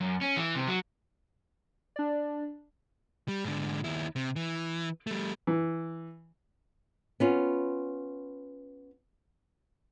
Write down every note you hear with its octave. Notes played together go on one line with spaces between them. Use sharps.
F#2
C#4
E3
C3
F#3
D4 D5
G3
G#2 D3
D#2 E4
C3
E3
G3 A3
E3
B3 C#4 F4